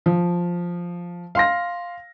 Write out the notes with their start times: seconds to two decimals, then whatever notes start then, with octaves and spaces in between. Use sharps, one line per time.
0.06 F3
1.35 F5 C6 A#6